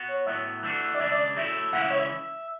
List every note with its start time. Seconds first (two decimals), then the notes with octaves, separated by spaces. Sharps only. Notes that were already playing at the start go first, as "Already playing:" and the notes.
Already playing: B3 F#4
0.08 C#5
0.27 A2 F#3 B3 E5
0.63 E3 A3 D4 F#4
0.95 D5
1.00 C#3 G#3 D4 E5
1.12 D5
1.36 F#3 A3 E4 E5
1.73 C#3 E3 G#3 C#4 E4 F#5
1.82 E5
1.90 C#5
1.99 E5